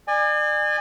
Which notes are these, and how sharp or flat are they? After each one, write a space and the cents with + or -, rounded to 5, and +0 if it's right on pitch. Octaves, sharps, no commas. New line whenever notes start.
D5 +40 G#5 -20